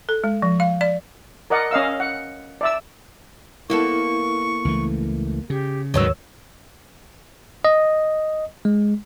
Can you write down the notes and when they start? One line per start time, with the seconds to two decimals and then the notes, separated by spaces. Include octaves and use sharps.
0.09 A4
0.24 G#3
0.42 F3
0.60 F5
0.81 D5
1.50 A#4 D5 D#5 F#5
1.71 C#4 D#5 F5 E6
2.00 F#5
2.61 D5 E5 E6
3.70 A#3 B3 E4 A4 C#6
4.65 C#2 E3 A3
5.50 C#3 G4
5.94 D#2 G#2 D#3 F#3 B4 C#5 E6
7.65 D#5
8.65 G#3